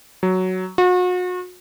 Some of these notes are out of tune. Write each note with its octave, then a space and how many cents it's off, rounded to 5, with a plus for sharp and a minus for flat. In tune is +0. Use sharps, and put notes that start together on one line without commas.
F#3 +5
F#4 -40